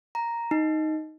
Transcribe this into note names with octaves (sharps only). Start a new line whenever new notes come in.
A#5
D#4